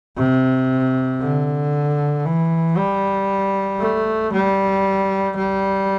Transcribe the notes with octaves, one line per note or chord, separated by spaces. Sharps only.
C3
D3
E3
G3
A3
G3
G3